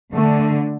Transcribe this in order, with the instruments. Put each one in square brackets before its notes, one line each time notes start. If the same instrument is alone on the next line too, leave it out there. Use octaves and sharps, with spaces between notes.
[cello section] D3 [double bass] A3